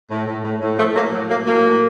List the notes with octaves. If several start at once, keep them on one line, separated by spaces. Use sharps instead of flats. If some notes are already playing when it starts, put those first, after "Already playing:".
A2
A2
A2
A2
A2 F3 A3
A2 F#3 A#3
A2 F#3
A2 F#3 A#3
A2 F#3 A#3
A2